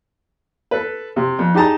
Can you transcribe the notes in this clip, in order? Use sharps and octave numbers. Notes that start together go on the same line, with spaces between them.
A4 B4
C3
F2
D#4 G4 G#4 A5 A#5